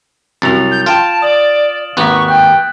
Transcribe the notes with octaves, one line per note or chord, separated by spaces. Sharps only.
C2 F#2 A6 F7
G6
F4 G5 A5 F6 D7 E7
D5 D#6 F#7
G#1 D#2 B3 C#6 F#6 B6
G5 F#6 G6